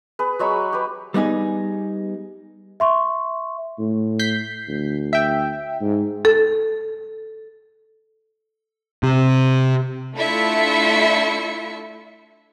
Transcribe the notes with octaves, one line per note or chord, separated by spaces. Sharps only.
G#4 B4
F#3 G#3 B5 C#6
G4 B4
G3 B3 D#4 G#4
E5 C6 C#6
A2
G6 B6 C7
D2
E5 G5
G#2
A4
C3
A3 D4 E4 F4 E5 C#7